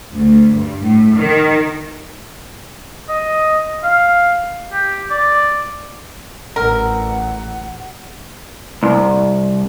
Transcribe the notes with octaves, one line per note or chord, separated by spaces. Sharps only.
D2
G2
A2
D#3
D#5
F5
G4
D5
A1 A#4 F#5
C2